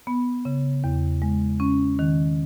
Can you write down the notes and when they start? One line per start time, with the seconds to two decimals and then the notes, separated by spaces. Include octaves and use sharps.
0.07 B3
0.45 C#3
0.84 E2
1.22 G#3
1.60 C#4
1.99 D#3